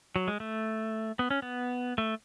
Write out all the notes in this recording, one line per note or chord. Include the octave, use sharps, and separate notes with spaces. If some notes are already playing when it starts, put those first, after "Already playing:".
F#3
G#3
A3
B3
C#4
B3
A3